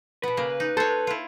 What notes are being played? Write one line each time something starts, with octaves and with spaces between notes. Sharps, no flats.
B2 B3 B4
C#3 A#3
D#4
A4 C5 C#5
E4 F4